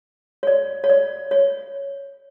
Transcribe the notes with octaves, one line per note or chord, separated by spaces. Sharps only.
C#5
D5
C#5
D5
C#5